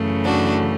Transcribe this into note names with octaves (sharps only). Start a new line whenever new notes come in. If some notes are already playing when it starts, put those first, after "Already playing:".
Already playing: F#2 C#3 E3 A3
D4 F#4